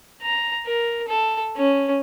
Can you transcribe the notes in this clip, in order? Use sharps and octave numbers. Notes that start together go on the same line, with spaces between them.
A#5
A#4
A4
C#4